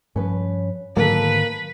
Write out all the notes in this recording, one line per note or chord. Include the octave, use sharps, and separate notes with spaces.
G2 F3 C#4 B4
G#2 D3 D#3 F#3 A#3 A4 B4